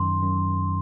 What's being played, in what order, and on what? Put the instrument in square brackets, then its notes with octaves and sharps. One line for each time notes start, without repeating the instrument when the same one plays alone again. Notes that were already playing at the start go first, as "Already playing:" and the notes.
Already playing: [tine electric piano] F#2 D#3 [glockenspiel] C6
[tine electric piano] F#2